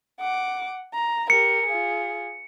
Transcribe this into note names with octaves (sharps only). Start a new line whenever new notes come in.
F#5 D6
A#5
G4 A#4 C#7
F4 G#4